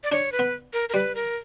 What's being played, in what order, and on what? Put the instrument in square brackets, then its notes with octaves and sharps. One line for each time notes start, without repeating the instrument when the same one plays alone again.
[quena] D5
[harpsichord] D4 [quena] C#5
[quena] B4
[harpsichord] B3
[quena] A#4
A#4
[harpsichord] G3 [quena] B4
[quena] A#4